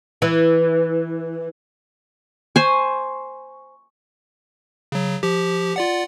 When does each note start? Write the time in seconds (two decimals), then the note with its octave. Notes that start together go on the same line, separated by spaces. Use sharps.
0.22 E3
2.56 C5 G#5 C#6
4.92 C#3 F#3
5.23 F3 G4
5.76 F4 D5 F#5